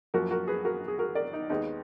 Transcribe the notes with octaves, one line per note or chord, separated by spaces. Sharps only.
F#2 F3 A#3 F#4 A#4
F#4 A#4
G#4 B4
F#4 A#4
G#4
F#4 A#4
A#4 D5
D#4
D#2 D#3 G#3 B3 D#4